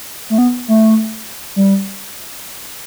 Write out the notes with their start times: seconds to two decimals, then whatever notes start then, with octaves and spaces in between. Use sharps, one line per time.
0.30 A3
0.38 B3
0.68 A3
1.56 G3